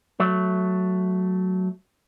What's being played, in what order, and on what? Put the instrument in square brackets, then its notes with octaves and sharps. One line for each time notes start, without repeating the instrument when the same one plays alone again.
[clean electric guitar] F#3 A3